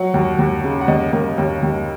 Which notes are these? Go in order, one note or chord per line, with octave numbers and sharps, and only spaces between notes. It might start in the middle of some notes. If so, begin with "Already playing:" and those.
Already playing: F#3 F#5
D#2
D#2
C#3
F#5
D#2 D#5
D#2 A#4
D#2 C#5
D#2